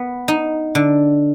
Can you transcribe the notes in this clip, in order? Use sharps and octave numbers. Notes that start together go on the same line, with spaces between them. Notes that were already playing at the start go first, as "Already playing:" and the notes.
Already playing: B3
D#4
D3